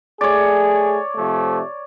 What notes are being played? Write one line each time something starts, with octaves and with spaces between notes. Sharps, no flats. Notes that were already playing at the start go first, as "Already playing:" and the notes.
A3 G#4 C#5 D5
C3 F3 A3